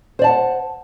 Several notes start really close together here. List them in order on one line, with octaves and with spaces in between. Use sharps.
C5 D5 A5 F#5